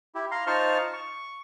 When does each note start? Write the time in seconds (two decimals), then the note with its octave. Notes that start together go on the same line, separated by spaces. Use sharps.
0.15 E4 G4
0.31 F5 A#5 C6
0.47 D#4 F4 C5 A5 C#6 F6
0.93 C#6